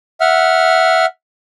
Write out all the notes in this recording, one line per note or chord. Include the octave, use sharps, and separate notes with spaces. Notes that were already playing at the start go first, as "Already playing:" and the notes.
E5 F#5 F6